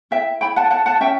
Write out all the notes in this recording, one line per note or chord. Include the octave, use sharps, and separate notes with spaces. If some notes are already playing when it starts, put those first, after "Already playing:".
E4 E5 G5
E4 G5 B5
F#5 A5
E4 F#5 A5
F#5 A5
C#4 E5 G5